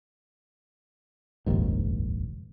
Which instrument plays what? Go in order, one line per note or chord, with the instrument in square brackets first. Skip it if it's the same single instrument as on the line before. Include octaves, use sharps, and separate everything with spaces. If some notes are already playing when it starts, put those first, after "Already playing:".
[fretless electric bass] F1 A#1 D#2 G#2